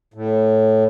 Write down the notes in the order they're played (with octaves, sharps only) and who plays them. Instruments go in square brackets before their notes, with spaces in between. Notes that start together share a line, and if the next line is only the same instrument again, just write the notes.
[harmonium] A2